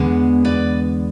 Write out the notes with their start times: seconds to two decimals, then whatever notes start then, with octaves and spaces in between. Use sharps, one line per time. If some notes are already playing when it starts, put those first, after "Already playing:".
Already playing: E2 D3 G#3 B3
0.45 B4 D5